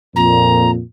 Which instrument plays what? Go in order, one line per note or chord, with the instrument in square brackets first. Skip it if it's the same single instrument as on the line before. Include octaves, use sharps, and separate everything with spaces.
[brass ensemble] F2 A#2 [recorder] A#5